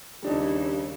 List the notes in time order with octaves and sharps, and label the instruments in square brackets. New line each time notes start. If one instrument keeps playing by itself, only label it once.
[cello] D#2 C#3 [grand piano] G3 D4 D#4